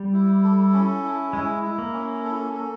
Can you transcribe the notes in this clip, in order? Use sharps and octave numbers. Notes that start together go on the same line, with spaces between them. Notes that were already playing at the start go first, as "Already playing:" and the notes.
Already playing: G3
E4
A4
C#4
E4
G#3 E4
E4
A#3
C#4
A4
A4